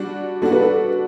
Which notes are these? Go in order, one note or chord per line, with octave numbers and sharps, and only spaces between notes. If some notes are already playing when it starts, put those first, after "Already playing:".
Already playing: G3 D4 F#4
G3 D4 F#4 A4
B4
A4